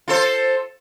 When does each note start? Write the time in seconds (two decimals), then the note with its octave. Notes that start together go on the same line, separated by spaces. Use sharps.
0.08 F4 A4 C5